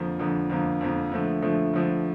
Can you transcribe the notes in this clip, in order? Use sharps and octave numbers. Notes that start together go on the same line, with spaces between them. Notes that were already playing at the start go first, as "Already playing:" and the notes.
Already playing: F2 D3 F3 A#3
F2 D3 F3 A#3
F2 D3 F3 A#3
F2 D3 F3 A#3
D3 F3 A3
D3 F3 A3
D3 F3 A3